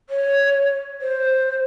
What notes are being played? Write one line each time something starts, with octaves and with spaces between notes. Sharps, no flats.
C#5
C5